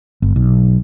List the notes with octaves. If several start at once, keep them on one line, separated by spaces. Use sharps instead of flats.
G1
B1